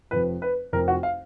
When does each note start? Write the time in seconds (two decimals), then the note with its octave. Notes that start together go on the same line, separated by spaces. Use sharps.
0.11 F1 F2 F3 B4
0.42 B4
0.73 F1 F2 F3 A#4
0.88 F#4
1.03 F5